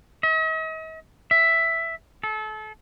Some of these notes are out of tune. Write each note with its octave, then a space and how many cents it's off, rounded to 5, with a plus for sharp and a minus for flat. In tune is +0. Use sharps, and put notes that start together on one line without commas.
D#5 +45
E5 +5
A4 -30